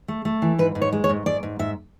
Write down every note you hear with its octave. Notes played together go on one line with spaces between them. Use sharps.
A3
A3
E3
G#2 B4
G#2
C#5
G#3
C#5
G#2
G#2 D5
G#2
G#2 E5